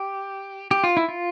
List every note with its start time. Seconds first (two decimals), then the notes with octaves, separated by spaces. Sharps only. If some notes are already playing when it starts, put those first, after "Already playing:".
Already playing: G4
0.71 G4
0.84 F4
0.97 E4
1.09 F4